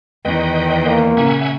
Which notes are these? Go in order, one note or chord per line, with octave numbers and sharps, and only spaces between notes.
E2 D#3 B4 D#5 G5
A#3
A#2 C#3 E5 F#5 G#5